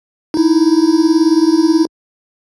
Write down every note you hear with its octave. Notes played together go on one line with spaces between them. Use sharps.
D#4 E4